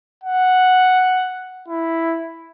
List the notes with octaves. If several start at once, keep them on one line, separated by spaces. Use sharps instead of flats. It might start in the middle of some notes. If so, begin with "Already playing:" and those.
F#5
E4